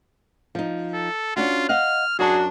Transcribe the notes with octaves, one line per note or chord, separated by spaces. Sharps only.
F3 D#4
A4
C#4 D4 F4 F#4
D#5 F5 F#5 F6
F#2 D4 F#4 G#4